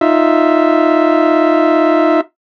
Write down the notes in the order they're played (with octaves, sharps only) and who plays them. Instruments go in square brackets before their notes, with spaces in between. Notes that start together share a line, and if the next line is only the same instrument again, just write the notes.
[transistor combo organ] D#4 F4 E5